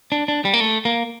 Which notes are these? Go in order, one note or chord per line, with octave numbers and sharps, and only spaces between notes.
D4
D4
G3
A#3
A3
A#3